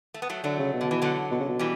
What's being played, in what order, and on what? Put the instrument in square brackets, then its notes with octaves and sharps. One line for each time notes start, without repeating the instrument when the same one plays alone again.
[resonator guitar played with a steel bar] A3
B3
F#3 A3
[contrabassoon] D3 [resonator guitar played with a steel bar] F#3 A3
[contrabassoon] C#3
B2
[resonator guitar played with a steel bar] D3
E3
D3 F#3
[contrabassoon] B2
C#3
B2
[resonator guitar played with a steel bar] E3 G3